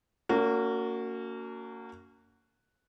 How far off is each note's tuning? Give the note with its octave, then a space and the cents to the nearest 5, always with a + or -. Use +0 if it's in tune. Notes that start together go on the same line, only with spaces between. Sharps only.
A#3 -25 C#4 +40 F#4 +0